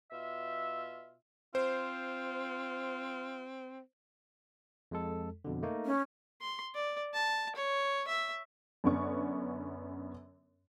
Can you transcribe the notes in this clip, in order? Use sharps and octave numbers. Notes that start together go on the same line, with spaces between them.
B2 F4 E5
C4 F4 C5
F2 G#3 A4
F2 B2 D3
A3 A#3 D#4
C#4
C6
D5
A5
C#5
E5
F#2 D3 B3 C#4 D5 C#6